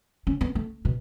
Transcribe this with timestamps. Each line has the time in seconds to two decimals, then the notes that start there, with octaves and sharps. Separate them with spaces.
0.27 C#4
0.41 B3
0.55 A3
0.85 B2